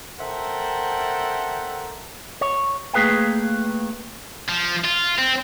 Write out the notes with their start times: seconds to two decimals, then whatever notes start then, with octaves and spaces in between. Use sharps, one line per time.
0.20 A4 A#4 C5 E5 F#5 G5
2.41 C#5
2.94 A3 A#3 G#4 B4 F5 G5
4.49 F3
4.85 F4
5.18 C4